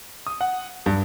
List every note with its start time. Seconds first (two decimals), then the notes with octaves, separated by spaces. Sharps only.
0.27 D#6
0.41 F#5
0.86 G2